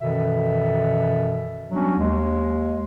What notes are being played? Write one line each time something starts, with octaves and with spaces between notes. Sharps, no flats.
F#2 B2 D#3 E3 A4 E5
F#3 G3 B3 C#4 D4 F#4
D#2 G#3